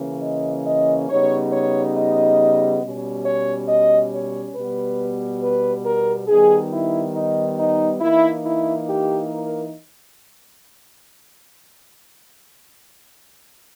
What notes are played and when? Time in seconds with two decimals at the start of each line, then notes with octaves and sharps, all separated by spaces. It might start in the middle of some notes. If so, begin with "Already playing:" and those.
Already playing: C#3 E3 A#3 C#4
0.21 D#5
0.64 D#5
1.08 C#3 G3 B3 D#4 C#5
1.51 C#5
1.94 D#5
2.81 B2 G3 C#4
3.24 C#5
3.68 D#5
4.11 C#5
4.54 B2 G3 B3 B4
5.41 B4
5.84 A#4
6.27 D#3 G3 B3 D#4 G#4
6.71 E4
7.14 D#4
7.57 D#4
8.00 E3 A#3 D#4 E4
8.44 E4
8.88 G4
9.30 A#4